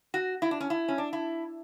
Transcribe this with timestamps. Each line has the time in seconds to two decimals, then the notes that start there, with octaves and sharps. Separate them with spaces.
0.14 F#4
0.42 E4
0.51 D4
0.61 C#4
0.70 E4
0.88 C#4
0.98 D4
1.13 E4